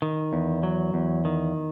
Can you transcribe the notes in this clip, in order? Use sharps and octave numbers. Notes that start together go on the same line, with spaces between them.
D#3
E2
F#3
E2
D#3